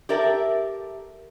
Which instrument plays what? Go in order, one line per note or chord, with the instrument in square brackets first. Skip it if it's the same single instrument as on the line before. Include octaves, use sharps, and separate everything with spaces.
[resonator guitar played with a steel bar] G4 A4 A#4 D5 E5